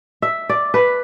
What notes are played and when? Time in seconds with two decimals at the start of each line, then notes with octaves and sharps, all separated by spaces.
0.22 E5
0.49 D5
0.74 B4